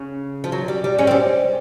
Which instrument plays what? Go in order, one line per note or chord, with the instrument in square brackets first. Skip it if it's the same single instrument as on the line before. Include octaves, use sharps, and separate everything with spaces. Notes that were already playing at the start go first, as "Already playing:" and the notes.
Already playing: [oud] C#3
[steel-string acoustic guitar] F3
F#3
G3
G3
[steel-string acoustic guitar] G#3 [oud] C#4
[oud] C4
[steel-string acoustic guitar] G3